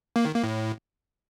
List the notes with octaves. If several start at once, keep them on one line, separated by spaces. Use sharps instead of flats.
A#3
D#3
A#3
A2